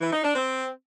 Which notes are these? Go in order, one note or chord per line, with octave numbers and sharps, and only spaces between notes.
E3
D#4
D4
C4